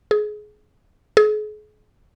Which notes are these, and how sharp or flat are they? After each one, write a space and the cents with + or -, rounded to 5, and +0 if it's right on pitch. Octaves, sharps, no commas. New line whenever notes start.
G#4 +25
G#4 +40